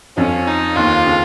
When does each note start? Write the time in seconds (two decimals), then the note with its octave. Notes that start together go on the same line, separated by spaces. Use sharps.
0.17 F2 F3 C#4
0.47 D#4
0.76 D#2 D#3 F4
1.06 C#3